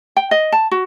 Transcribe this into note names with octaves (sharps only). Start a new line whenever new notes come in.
G5
D#5
A5
F#4